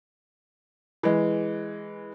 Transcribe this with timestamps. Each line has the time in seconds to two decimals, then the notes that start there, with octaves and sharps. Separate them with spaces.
1.03 E3 G#3